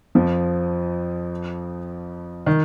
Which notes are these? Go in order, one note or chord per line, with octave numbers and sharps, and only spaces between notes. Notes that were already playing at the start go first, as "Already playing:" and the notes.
F2 F3
D#3